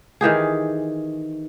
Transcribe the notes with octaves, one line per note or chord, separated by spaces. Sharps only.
D#3 E3 G4 G#4